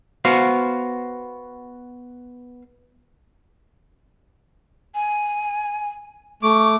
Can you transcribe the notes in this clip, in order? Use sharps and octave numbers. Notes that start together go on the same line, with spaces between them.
B3 F#4 C5 F5
G#5
A3 C#6 D6